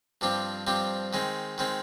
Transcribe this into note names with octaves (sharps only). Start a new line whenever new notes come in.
G2 F3 C4 G4
G2 F3 C4 G4
D#3 G#3 C4
D#3 G#3 C4